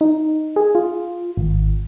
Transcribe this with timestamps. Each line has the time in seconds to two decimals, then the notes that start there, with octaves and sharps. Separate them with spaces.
0.01 D#4
0.56 G#4
0.75 F4
1.37 G#1